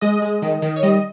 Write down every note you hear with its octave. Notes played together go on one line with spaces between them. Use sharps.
G#3 D#5
G#3
D#3
D#3
C#5
G3 D#5